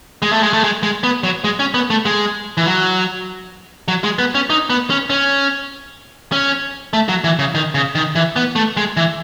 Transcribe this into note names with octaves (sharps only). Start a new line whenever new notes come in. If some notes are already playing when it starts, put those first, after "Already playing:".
G#3
A3
G#3
A3
G#3
G#3
B3
F#3
G#3
C#4
B3
A3
G#3
E3
F#3
F#3
G#3
B3
C#4
D#4
B3
C#4
C#4
C#4
A3
F#3
E3
C#3
D#3
C#3
D#3
E3
B3
A3
G#3
E3